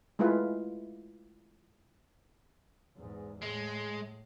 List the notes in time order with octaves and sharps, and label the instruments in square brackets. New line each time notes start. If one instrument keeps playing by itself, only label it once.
[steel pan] G#3 A3 E4 F4 B4
[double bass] E2 G#2
[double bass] A2 [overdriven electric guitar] G#3